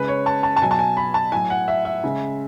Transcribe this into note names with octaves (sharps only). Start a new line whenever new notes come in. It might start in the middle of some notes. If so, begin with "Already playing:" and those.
Already playing: C#3 G#3 B4
C#5
A5
A5
A5
B2 F#3 G#5
A5
G#5
B5
A5
A2 F#3 G#5
F#5
E5
E5
C#3 G#3